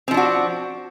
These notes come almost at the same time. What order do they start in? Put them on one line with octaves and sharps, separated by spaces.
C4 F3 D4 F#4